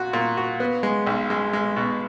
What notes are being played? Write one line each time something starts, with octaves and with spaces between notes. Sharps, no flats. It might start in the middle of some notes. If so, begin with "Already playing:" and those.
Already playing: A#2 F#4
A#2
F#4
B3
G#3
B1
G#3
G#3
B2